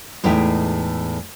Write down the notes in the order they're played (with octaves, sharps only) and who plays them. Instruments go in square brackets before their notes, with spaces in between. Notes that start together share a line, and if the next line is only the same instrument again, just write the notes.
[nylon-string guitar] E2 A2 G#3 D#4 E5 G5